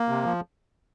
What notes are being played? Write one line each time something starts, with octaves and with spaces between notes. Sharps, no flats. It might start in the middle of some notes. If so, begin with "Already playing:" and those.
Already playing: A#3
C3
F3